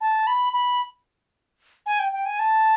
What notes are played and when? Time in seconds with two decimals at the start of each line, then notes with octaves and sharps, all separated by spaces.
0.01 A5
0.27 B5
0.53 B5
1.86 G#5
1.99 G5
2.12 G5
2.26 G#5
2.39 A5